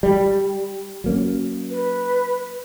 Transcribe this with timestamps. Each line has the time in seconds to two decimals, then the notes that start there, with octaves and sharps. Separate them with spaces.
0.03 G3
1.04 F#3 A#3 C#4
1.70 B4